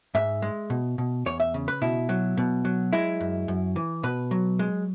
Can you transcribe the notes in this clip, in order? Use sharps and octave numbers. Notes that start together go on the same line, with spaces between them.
G#2 E5
G#3
B2
B2
E2 C#5
E5
C#3
B4
B2 E4
F#3
B2
F#3
G#3 E4
F#2
F#2
E3
B2 B4
F#3
G#3